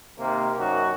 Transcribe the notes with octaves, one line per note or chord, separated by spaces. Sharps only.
C3 D#3 A#3
F#2 D#4 F#4